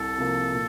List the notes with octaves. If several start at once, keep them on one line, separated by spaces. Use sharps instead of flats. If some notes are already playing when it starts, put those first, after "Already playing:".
Already playing: C2 A4
C3 F3 A#3
A#2